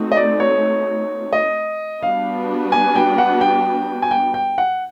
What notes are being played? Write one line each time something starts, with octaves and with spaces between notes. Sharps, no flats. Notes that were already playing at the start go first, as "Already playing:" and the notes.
Already playing: A3 C4 D#4 F#4
D#5
D5
C#5
D#5
G3 B3 D4 F#4 B4 F5
G#5
G5
F#5
G5
G#5
G5
G5
F#5